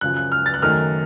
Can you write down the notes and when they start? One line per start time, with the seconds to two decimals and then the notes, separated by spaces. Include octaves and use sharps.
0.01 F#2 C#3 F3 F#6
0.17 F#6
0.32 F6
0.46 A6
0.54 F#6
0.62 F#2 D#3 A3 F6